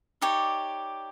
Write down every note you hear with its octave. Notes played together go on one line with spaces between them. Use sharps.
D#4 G4 C#5 D5